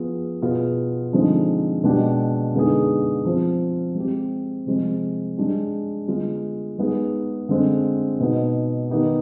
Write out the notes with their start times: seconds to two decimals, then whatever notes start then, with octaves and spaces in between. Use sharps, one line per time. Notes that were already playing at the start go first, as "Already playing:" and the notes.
Already playing: F3 B3 F4 G#4
0.42 B2 B3 F4 G#4
1.13 D3 F3 G#3 C4 D#4
1.84 B2 G#3 D4 G4
2.54 D3 G#3 B3 D#4 G#4
3.25 F3 C4 F4
3.95 G#3 C4 G4
4.66 C3 F3 G#3 C4
5.38 G#3 D4 G4
6.08 D3 G#3 B3 F4
6.79 G#3 B3 D#4 G#4
7.49 D3 G#3 C4
8.20 B2 B3 D#4
8.90 D#3 B3 D#4 G4